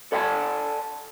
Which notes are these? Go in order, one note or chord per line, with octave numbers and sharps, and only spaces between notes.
A4 D5 E5 F#5 G#5 A5